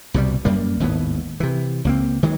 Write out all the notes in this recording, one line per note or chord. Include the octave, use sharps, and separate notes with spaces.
C2 B2 F#3 G3
F#2 G3 A#3
G#1 D#2 A2 B3
C3 E3
C#2 A#3 C4
D#3 E3 F#3 G#3